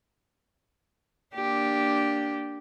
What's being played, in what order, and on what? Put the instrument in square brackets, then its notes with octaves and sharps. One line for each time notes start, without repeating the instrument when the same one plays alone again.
[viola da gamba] A#3 D4 G4